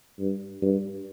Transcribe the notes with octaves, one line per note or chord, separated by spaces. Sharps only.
G2
G2